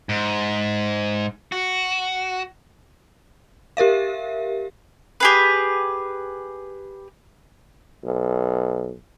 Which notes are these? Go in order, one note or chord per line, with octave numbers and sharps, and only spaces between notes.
G#2
F#4
G4 A#4 E5 F5
G4 G#4 B4
B1